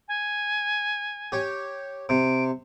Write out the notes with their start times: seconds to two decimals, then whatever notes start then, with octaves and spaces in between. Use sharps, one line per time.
0.08 G#5
1.32 G4 C#5
2.09 C3 D7